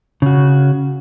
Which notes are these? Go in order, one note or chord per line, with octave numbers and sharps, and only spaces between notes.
C#3 F#4